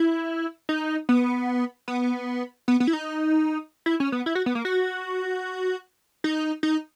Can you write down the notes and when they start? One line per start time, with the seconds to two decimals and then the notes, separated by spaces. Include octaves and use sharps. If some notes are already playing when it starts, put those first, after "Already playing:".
Already playing: E4
0.69 D#4
1.09 B3
1.88 B3
2.68 B3
2.80 B3
2.87 E4
2.93 D#4
3.86 E4
4.00 C#4
4.12 B3
4.26 E4
4.35 F#4
4.46 B3
4.55 A#3
4.65 F#4
6.24 D#4
6.63 D#4